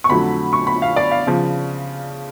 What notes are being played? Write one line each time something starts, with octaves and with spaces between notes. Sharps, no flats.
C#6
F2 D3 F#3 A3 B5
C#6
B5
F5
D5
F5
C#3 F3